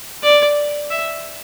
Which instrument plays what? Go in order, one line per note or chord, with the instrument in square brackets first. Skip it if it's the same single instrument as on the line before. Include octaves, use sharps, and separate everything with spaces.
[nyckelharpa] D5
E5